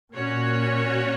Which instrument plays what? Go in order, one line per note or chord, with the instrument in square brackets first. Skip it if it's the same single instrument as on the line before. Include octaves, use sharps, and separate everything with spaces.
[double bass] A#2 [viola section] A#3 C#4 F#4 C#5